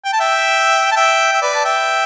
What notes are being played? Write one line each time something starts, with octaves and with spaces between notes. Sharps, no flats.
G5
A5
E5 G5
A5
E5 G5
E5
B4 D5
A5
E5 G5